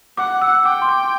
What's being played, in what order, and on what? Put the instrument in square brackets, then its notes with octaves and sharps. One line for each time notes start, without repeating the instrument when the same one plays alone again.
[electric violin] F#5 [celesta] D6
[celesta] E6
[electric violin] G5 [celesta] D6
[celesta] C6
D6